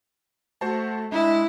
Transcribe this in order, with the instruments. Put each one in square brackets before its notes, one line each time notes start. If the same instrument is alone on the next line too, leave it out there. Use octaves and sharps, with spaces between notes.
[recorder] A3 [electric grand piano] F#4 C5 A5
[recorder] G#3 [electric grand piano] D4 [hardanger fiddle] E4